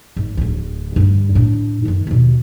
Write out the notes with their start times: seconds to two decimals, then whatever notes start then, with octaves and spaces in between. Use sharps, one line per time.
0.16 G#1
0.37 D1 D2
0.96 G2 G3
1.35 A2 D4
1.85 F#2 D#3
2.07 D#2 B2